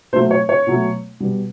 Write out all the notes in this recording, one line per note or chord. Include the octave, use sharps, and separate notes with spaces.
B2 F#3 A3 C5
C#5
C#5
B2 F#3 A3
B2 G3 B3